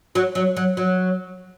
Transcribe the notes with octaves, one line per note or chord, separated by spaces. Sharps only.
F#3
F#3
F#3
F#3